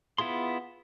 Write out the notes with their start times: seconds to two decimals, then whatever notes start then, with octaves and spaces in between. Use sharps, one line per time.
0.18 B3 E4 F4 G#4 C6